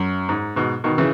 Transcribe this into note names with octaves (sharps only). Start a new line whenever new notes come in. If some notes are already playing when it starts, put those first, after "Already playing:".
Already playing: F#2
G#2
G#2 B2
B2 D#3
C#3 E3